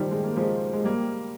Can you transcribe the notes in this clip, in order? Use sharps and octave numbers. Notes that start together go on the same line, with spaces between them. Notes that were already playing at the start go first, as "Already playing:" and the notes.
Already playing: D#3 F3 G3
G#3
A#3
F3 G#3
G#3
G3 A#3